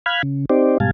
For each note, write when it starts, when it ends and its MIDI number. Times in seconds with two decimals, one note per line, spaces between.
0.06 0.22 77
0.06 0.22 83
0.06 0.22 89
0.06 0.22 90
0.06 0.22 92
0.23 0.45 49
0.50 0.78 60
0.50 0.78 63
0.50 0.78 67
0.50 0.78 72
0.50 0.78 74
0.80 0.91 44
0.80 0.91 47
0.80 0.91 55
0.80 0.91 77
0.80 0.91 80
0.80 0.91 81